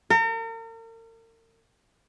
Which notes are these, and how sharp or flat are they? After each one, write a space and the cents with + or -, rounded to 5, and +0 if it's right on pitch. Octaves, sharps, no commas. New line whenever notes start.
A#4 -40